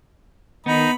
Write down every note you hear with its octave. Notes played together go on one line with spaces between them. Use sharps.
D#3 B3 D#4 B5